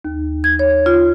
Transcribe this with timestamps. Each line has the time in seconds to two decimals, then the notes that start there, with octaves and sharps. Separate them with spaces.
0.05 D#2
0.44 G#6
0.59 C#5
0.86 F4